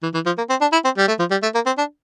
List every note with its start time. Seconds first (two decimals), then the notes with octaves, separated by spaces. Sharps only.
0.03 E3
0.14 E3
0.26 F3
0.37 A#3
0.50 C4
0.61 D4
0.72 E4
0.84 C4
0.97 G3
1.08 A3
1.19 F3
1.31 G3
1.43 A3
1.54 A#3
1.66 C4
1.78 D4